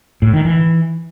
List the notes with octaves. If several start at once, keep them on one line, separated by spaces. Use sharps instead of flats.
A2
D#3
E3